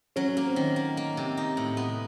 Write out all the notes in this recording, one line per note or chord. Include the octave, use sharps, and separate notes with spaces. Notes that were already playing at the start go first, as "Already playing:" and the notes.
F#3 C#4
A#3
C4
D#3
A#3
A#3
C3
D#4
A2
B3